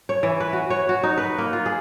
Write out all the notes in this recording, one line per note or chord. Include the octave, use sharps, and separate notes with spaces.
C#5
E3
B4
F#4
C#5
F#4
D#4
B4
A#3
F4
G#4